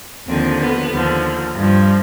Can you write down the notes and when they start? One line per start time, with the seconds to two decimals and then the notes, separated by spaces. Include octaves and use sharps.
0.28 D#2 D3 F3 C4
0.60 B3
0.91 D#2 D3 F3
1.55 G2 F3